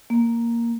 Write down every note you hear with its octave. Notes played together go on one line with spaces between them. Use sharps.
A#3